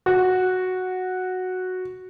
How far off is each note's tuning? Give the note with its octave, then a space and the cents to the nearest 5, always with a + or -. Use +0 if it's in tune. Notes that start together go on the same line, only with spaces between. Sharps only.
F#4 -5